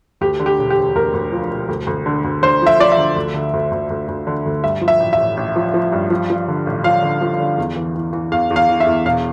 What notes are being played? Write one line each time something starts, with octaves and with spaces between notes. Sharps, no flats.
D2 G4
D3
G4
E1
G4
E1
D2 A#4
D2
F3
E1
D2
D2
D3
D2
D3 C5
F3 E5
F3 D5
E5
D3
D2
D3
D2
D2
D2
D2
D3
D2
G2 E5
F3
E5
A1
E5
A1
A1
F3
F3
G2
F3
F3
D3
A1
F3 F5
D3
F3
D3
E2
E3
E3
E3
E2 F5
E2
F5
E3
E5
E2
E1 F5